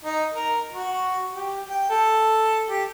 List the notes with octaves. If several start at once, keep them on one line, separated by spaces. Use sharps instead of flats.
D#4
A#4
F#4
G4
G5
A4
G4